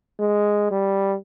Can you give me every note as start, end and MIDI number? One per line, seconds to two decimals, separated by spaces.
0.19 0.67 56
0.71 1.16 55